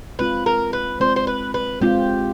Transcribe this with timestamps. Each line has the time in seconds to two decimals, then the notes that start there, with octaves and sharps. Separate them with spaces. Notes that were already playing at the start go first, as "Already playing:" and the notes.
0.19 G#3 C4 F4 B4
0.46 A#4
0.73 B4
1.00 G#3 C4 F4 C5
1.16 C5
1.27 B4
1.54 B4
1.81 G#3 C4 F4 G4